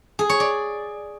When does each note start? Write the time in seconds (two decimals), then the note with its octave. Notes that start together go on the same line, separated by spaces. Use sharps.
0.19 G#4
0.29 C#5
0.40 D5